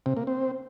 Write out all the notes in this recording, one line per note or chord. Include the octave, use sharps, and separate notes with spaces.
C3
A#3
C4